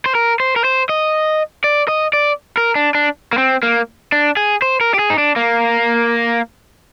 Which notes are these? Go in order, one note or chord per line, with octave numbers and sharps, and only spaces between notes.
C5
A#4
C5
A#4
C5
D#5
D5
D#5
D5
A#4
D4
D4
A#3
C4
A#3
D4
G#4
C5
A#4
G4
G#4
D#4
D4
A#3